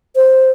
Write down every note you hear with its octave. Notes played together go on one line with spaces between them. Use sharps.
C5